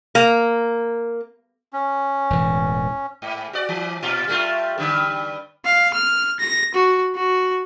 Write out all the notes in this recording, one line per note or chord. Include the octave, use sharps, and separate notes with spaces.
A#3
C#4
E1 A2 E3
G#2
F#4 D5
E3
A#2 F4
G3 A3 F4
G2 D3
F5
F6
A#6
F#4
F#4